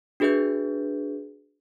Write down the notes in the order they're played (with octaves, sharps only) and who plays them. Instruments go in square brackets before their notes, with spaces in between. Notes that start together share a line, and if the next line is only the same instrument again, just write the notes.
[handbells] D4 F#4 G#4 B4 E5 G6